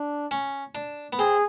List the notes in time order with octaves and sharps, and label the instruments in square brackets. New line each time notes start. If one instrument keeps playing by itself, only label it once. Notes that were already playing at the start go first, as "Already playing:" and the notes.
Already playing: [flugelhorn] D4
[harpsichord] C#4
D4
B3
[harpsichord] C4 [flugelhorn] G#4